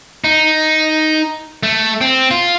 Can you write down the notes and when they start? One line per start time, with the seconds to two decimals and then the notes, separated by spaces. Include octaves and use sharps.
0.24 D#4
1.63 A3
2.01 C4
2.31 F4